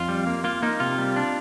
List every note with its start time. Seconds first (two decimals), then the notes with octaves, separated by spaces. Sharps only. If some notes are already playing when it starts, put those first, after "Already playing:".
Already playing: F2 F4
0.09 G3
0.27 A#3
0.44 A#3 F4
0.62 A#3 D#4
0.80 C3 F4
0.98 G3
1.16 D4